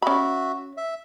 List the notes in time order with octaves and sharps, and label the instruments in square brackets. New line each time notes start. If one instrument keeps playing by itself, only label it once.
[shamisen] C#4 B5 [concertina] F#4 E5
[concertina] E5